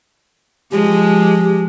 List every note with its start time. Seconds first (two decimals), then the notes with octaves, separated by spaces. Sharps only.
0.72 F3 G#3 G4